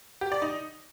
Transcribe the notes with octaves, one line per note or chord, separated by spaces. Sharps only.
G4
D5
D#4